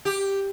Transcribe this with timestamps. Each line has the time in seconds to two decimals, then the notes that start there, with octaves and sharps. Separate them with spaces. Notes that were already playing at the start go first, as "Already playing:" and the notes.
0.05 G4